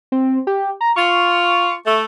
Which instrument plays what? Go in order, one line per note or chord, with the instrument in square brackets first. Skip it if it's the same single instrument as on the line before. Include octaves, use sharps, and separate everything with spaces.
[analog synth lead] C4
G4
A#5
[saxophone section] F4 [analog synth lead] C#6
[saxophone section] A3